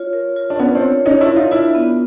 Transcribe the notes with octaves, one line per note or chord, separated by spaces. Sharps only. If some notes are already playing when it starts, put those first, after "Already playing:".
Already playing: F4 C#5
A#4
F4
D4
B3 C#4 F4
C4 D4
C#5
C#4 D#4 A#4
D4 E4
A#4
D#4 F4
D4 E4 F4
B3